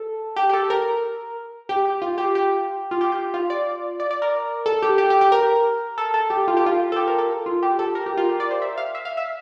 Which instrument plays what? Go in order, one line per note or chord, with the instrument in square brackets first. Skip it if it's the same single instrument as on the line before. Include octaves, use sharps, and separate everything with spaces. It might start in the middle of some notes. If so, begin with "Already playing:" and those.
Already playing: [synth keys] A4
G4
G4
A4
A#4
G4
G4
F4
G4
G4
F4
G4
G4
F4
D5
D5
D5
A#4
A4
G4
G4
G4
G4
A#4
A4
A4
G4
F4
G4
F4
A4
G4
A#4
A4
F4
G4
A4
A#4
G4
F4
G4
D5
C5
E5
F5
E5
F5
E5